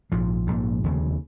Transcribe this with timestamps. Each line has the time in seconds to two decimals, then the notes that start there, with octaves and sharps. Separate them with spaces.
0.12 A#1 G#2 F3
0.47 A#1 G#2
0.84 F1 D#2 C#3